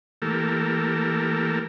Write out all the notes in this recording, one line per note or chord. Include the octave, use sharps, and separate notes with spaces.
E3 A3 A#3 G4 A4 A#4